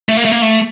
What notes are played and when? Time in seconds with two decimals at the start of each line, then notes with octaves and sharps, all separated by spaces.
0.09 A3
0.17 A#3
0.25 A3
0.32 A#3
0.42 A3